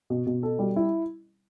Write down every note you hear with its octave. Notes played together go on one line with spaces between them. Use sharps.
B2
B2
A4
G3
E4